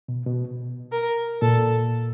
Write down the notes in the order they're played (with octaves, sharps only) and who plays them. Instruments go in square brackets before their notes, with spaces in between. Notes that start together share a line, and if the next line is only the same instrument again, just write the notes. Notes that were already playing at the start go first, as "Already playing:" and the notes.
[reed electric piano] B2
B2
[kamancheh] A#4
[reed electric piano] A#2 [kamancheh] A4